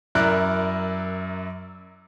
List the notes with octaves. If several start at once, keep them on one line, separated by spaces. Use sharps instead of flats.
F#2 E4 A#4 D5 F#6